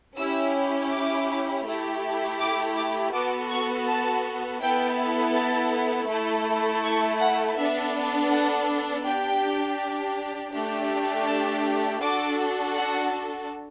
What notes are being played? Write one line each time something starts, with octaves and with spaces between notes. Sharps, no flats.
C#4 E4 G4 E6
D6
A3 E4 G4
D6
D6
B3 F#4 A4 D6
C#6
A5
B3 E4 A4 G5
A5
A3 E4 A4
C#6
F#5
B3 D4 A4 E5
F#5
D4 G4 G5
A3 D4 G4
A5
D4 F#4 A4 D6
F#5